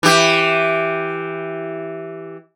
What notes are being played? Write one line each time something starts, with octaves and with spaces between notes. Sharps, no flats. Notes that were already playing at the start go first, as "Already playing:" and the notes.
E3 G4